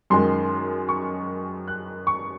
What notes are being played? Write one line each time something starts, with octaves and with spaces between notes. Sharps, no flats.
F#2 D#3 G#3 C6
C#6
F#6
C#6